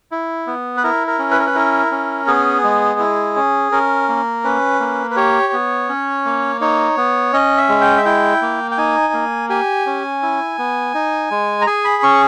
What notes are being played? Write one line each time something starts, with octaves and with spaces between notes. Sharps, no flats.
E4
B3
B4
E4 A#4
A#4
C#4
B4
A#4
B4
E4 A#4
C#4
B3 G#4
G#3
E4
C#4
C#4 A#4
A#3
C#4 B4
A#3
B4
G4 C#5
B3
C#4
A#3
D#4 C#5
B3
C#4 D#5
E5
G#3
G5
E5
E4 G5
A#3
G5
D#4 G#5
A#3
G4 G#5
C#4
E4
B3
D#4
G#3
A#5
G#4 G#5
B5
C#4 C#6